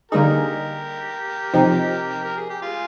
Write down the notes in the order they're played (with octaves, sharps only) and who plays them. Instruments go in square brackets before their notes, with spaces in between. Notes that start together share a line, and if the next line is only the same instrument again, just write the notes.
[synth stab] D3 G3 A#3 D#4 G#4 [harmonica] G4 A#4
[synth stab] C3 F3 C4 D#4
[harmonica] A#4
G#4
G4
F4 G#4